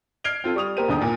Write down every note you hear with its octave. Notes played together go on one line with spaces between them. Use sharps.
F6 G#6 C7 D7 F7 G7
C4 F4 A4
G3 C#6 D#6 F7
A#3 G4 A#4 C5 D#7
E1 D#2 D3 G5 D#6
A#2